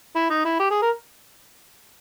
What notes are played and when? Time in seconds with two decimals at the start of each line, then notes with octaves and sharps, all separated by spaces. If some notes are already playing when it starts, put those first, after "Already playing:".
0.16 E4
0.30 D#4
0.45 E4
0.59 G4
0.71 G#4
0.82 A#4